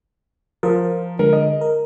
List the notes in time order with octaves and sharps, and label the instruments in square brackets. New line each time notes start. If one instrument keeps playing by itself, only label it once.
[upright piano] F3 [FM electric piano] A#4 C5
[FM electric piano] D3 G#3 [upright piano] A#4
[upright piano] D#5
[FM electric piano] A#4